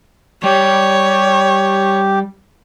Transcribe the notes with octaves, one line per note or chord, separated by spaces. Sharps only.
G3 G4 C#5